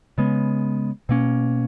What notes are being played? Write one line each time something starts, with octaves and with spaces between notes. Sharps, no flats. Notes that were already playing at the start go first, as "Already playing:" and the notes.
C#3 G#3 B3
B2 A#3 C#4